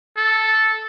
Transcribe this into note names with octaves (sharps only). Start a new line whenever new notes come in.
A4